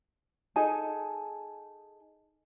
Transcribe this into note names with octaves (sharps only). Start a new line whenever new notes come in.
D#4 G#4 A4 G#5